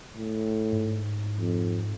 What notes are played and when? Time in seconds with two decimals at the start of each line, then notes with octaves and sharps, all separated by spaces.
0.17 A2
0.72 G#2
1.40 F2